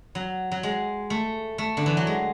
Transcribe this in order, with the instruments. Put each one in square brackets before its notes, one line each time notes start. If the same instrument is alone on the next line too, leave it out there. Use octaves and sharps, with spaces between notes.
[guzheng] F#3
F#3
G#3
A3
A3
D3
E3
F#3
G#3